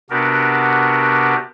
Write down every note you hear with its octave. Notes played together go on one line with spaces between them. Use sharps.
C3 B3 D4 F#4 G4 A#4